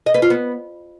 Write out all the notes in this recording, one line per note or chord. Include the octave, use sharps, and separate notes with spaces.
D#5
B4
F4
B3